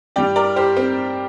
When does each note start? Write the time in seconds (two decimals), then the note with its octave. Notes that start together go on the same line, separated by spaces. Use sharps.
0.16 G2 G3 D5 G5
0.36 A#4 D5
0.56 G4 C5
0.77 C4